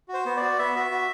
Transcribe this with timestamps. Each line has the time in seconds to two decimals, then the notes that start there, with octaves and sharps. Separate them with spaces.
0.08 F#4
0.14 C5
0.26 B3
0.37 F#4 D5
0.59 B3 E5
0.75 F#4
0.91 F#4